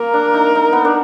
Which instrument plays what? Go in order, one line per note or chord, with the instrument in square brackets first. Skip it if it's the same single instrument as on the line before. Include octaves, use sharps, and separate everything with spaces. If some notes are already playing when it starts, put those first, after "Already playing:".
Already playing: [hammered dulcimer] A#3 [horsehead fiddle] A#4
[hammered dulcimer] D4
D#4
D#4
B3
D4